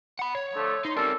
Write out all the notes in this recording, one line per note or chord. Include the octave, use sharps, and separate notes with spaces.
F#5 B5
C#5
D3 F3 A3
D#4 C6
G3 C4 C#4 A4 A#4